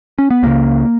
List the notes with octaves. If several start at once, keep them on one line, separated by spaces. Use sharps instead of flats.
C#4
B3
C#2 C#3 A#3